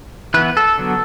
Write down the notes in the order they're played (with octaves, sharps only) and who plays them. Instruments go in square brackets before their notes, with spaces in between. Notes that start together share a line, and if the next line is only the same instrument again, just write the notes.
[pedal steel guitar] E3 B3 B4
A4
D3 F#3 B3